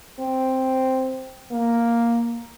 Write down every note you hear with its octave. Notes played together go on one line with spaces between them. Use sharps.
C4
A#3